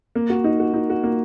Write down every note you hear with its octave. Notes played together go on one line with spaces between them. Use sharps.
A#3
F#4
D#4
F#4
D#4
F#4
A#3